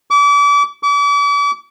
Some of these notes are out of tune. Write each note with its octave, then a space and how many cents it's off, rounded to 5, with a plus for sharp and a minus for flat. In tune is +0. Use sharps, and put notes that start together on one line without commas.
D6 -35
D6 -40